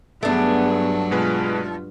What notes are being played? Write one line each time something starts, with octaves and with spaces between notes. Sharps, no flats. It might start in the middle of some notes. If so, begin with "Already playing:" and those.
G2 F#3 A3 B3 D4 G#4
B2 G#3 F4 B4